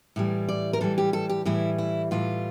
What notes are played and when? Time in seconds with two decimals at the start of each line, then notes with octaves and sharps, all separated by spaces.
0.16 A2 E3 G3
0.49 D5
0.73 A#4
0.81 A2 E3 G3 A4
0.98 G4
1.13 A4
1.29 G4
1.45 A2 E3 G3 E4
1.78 E4
2.11 A2 E3 G3 F4